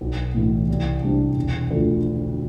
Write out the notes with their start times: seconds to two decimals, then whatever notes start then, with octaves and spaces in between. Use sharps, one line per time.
0.01 B1
0.34 A2 E3
0.69 C2
1.03 C3 G3 D4
1.36 E1
1.71 D2 D3 F3 A3